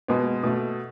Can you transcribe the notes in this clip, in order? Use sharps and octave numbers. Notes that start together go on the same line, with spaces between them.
B2 G#3 B3
B2 A3